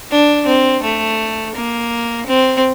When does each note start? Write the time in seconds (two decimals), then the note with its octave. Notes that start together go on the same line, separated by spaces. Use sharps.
0.11 D4
0.47 C4
0.83 A3
1.55 A#3
2.27 C4